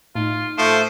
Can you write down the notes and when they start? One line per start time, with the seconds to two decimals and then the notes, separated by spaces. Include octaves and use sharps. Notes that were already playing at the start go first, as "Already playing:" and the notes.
0.15 A2 D#4 F4
0.58 F3 A3 C5